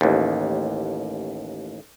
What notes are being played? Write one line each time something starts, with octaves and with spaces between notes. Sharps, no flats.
A1 D#2